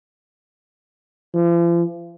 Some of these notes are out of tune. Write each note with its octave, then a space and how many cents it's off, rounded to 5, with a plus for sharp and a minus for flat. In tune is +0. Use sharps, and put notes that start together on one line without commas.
F3 -40